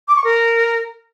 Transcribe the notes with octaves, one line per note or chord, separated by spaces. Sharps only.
D6
C#6
A#4